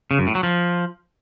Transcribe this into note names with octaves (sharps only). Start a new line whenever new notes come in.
C#3
F#2
A2
F#3
F3